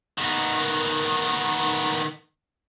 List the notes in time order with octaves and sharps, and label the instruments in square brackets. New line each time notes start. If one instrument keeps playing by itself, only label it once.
[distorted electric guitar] D#3 B3